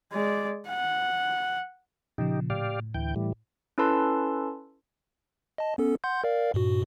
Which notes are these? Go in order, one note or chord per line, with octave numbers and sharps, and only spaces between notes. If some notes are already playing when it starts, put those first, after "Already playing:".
G#3 D5
F#5
A#2 C#3 F3 D#4 G4
A2 G4 D5 F5
D2 E3 G5
A2 E3 G3
C#4 E4 A4 B4 A5 C6
D#5 A5
B3 C#4 A4
F#5 C6 G6
A#4 D5 F5
G2 A#2 F#4